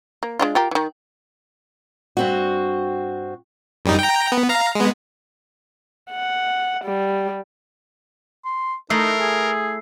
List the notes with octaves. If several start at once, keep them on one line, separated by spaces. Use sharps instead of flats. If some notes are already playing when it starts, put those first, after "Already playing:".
A#3
G#3 D4 F4
F4 G4 A#4
D#3 E3
G2 C4 F#4
F#2 G3 D#4
G5 A#5
B3
F5 A#5
G#3 B3
F#5
G3
C6
A3 D#4 E4 A#4 E6 C7
G#4